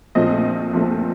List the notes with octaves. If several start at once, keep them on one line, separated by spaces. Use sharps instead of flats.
A#1 A#2 F3 A3 C4 D#5
A#1 A#2 F3 A3 C4